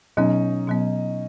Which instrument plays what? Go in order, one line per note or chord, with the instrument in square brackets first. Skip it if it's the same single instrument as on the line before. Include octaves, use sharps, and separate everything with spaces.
[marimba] B2 F#3 B3 [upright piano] C#4 D#4
[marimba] B2 F#3 B3